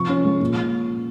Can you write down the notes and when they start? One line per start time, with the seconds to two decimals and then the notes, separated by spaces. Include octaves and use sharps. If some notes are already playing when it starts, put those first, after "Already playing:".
Already playing: C3 F3 C#6
0.09 C#4
0.25 G#3
0.41 A#2